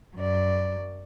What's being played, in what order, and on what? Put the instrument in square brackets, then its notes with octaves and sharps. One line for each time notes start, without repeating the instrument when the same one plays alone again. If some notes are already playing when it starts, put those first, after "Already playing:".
[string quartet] F#2 D5